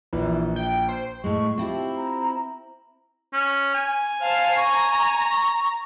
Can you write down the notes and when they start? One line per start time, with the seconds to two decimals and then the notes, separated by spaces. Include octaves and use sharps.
0.13 A#1 E3
0.56 G5
0.89 C5
1.24 A2 G#3 C#6
1.58 C4 E4 F4 G4 A5
1.96 A#5
3.33 C#4
3.75 G#5
4.21 C5 F5 A5 F6
4.57 A#5 C#6